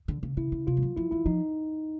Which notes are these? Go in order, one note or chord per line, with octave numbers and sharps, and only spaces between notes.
D3
C#3
C#3 E4
C#3
C3 F4
G3
F#3
F3 E4
E3 E4
F3 D#4